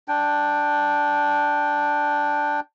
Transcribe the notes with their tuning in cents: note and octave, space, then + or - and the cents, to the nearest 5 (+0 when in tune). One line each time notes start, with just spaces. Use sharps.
D4 +0 G5 +0